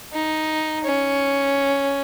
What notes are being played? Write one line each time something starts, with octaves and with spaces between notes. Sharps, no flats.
D#4
C#4